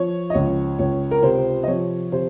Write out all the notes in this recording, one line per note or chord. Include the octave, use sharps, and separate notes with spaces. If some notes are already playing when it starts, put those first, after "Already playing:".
Already playing: F3 C#5
D#5
C#2 C#5
C#2 C#5
A#4
C3 C5
D#5
F3 C#5
C3 C5